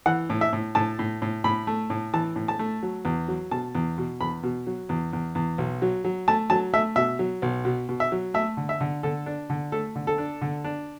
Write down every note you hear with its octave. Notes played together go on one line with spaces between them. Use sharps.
E3 F#5
A2
E5
A2
A2 A5
A2
A2
A2 B5
A3
A2
E3 A5
A2
A5
A3
F#3
E2
F#3
B2 A5
E2
B2
E2 B5
B2
F#3
E2
E2
E2
B1
F#3
F#3
A3 A5
F#3 A5
A3 E5
B2 E5
F#3
B1
B2
B2
E5
F#3
A3 E5
D3
E5
D3
D3 A4
D4
D3
A3 A4
D3
A4
D4
D3
D4